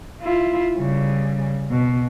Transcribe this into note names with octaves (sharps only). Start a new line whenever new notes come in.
E4 F4
C#3 G3
B2